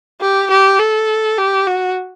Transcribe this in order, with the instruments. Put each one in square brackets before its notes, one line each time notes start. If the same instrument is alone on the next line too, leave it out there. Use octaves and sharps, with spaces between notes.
[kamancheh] G4
G4
A4
G4
F#4